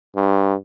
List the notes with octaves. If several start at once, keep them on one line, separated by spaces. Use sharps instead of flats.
G2